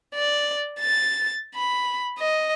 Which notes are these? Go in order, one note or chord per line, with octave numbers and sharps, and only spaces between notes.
D5
A6
B5
D#5